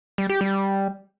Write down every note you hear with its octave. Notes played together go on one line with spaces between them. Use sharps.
G3
G4
G3